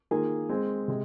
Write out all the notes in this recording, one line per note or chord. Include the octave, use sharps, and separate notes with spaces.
D#3 A#3 F4 G#4
G#3 C4 G#4
C3 G#3